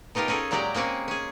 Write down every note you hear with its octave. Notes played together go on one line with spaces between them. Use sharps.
B2 D#4 F4 G4 A#4
C#4 D#4 G#4 A4
A#2 F#3 G#3 G4 D5 A#5
G#3 A#3 C4 C#4 G#4
C#4 G#4